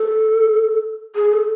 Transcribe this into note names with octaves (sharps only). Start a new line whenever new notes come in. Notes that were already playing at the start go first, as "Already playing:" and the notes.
Already playing: A4
G#4
A4